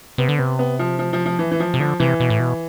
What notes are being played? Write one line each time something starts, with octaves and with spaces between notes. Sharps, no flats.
C3 B3
D3
C3 B3
B3
F3
F3
F3
F3
E3
E3
F3
C3
D3 F3
C3 E3
B2
A2
B2